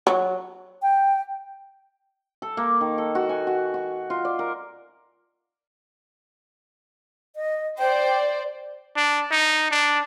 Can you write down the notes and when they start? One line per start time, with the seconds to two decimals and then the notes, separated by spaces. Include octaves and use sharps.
0.07 F#3
0.82 G5
2.42 A4
2.57 A#3
2.81 D#3
2.98 A4
3.15 F#4
3.29 G#5
3.47 F#4
3.74 F#4
4.10 F4
4.25 D5
4.39 A#4
7.36 D#5
7.79 C5 D5 G5
8.96 D4
9.31 D#4
9.71 D4